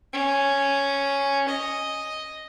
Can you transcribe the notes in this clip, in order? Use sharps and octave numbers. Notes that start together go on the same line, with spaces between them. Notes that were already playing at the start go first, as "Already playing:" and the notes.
C#4
D#5